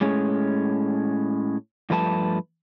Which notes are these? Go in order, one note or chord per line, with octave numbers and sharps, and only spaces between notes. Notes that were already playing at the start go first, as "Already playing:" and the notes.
A2 G#3 C#4
G2 F3 A3 B4 G#5 A5